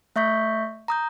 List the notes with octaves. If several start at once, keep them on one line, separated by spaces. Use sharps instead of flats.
A3 E5 C#6 G6 B6
A#5 D#6 G6